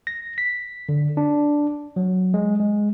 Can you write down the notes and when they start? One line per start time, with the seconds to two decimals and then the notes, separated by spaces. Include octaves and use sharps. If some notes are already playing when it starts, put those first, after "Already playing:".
0.07 A#6
0.38 B6
0.89 D3
1.17 D4
1.96 F#3
2.34 G#3
2.60 G#3